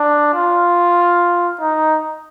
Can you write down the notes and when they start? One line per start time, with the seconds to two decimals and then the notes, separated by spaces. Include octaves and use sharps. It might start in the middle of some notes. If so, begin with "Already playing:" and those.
Already playing: D4
0.35 F4
1.61 D#4